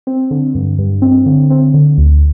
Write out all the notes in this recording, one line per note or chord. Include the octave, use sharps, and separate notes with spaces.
C4
D3
G2
G2
C4
D3
C4
D3
D2